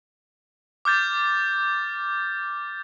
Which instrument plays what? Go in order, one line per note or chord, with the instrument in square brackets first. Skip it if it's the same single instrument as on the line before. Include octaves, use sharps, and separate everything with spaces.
[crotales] D6 F6 G6 A6